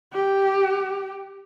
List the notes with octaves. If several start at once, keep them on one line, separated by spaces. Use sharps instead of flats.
G4